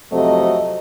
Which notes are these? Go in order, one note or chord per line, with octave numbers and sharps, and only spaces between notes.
F2 C3 F#3 A3 D#5